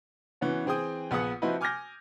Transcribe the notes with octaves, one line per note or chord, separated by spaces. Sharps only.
E3 B3 C#4 F#4
E3 C4 G#4 G5 D#6
A#1 B3 G#4 F#5 D#6 C#7
F3 C4 D#4 E4 F#4 B4
G#5 D6 F6 G6 G#6 A#6